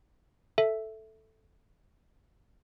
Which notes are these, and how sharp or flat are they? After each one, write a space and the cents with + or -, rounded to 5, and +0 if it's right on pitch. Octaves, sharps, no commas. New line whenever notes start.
A4 +0 E5 +0